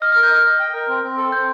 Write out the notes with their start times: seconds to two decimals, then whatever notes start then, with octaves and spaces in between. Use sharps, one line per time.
0.02 D#5 F6
0.12 A#4 F6
0.23 G6
0.31 D#5 F6
0.46 D#5
0.59 G5
0.73 A#4
0.88 C4
1.03 C4
1.17 A4
1.32 C4 G6